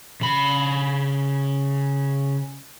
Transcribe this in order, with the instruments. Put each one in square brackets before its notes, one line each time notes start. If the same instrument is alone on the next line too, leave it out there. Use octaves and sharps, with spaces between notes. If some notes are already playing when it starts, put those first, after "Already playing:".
[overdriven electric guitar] C#3 B5